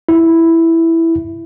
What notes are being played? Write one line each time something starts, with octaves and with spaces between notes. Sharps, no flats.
E4